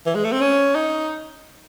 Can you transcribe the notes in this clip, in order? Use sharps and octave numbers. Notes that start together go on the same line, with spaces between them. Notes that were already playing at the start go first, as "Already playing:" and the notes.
E3
G#3
A3
C4
C#4
D#4